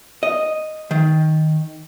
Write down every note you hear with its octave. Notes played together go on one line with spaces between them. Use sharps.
D#5
D#3